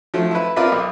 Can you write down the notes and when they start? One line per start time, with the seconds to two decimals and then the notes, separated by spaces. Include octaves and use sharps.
0.14 F3 F#3 A3
0.31 E4 B4
0.56 C4 F4 A#4 B4 D5 E5
0.72 B1